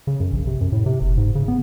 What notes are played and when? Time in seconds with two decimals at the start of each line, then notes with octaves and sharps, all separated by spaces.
0.07 C#3
0.20 F#2
0.33 A#1
0.47 C3
0.61 F#2
0.72 A2
0.86 C3
1.01 F#1
1.17 G#2
1.35 C#3
1.48 B3